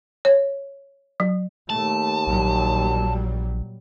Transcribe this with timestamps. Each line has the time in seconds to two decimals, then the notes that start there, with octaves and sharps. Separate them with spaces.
0.25 C#5
1.20 F#3
1.70 D#2 A3 A5
2.27 A#1 A#2 F#3 G3